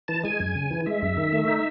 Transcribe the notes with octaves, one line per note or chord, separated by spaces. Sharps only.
E3 A5
G#3 G#5
F#2
C#3
E3
G#3 E5
F#2
D#3
A3
D#4